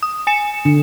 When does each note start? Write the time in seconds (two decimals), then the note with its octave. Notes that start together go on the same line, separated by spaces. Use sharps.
0.03 D#6
0.27 G#5 C#7 E7
0.65 D3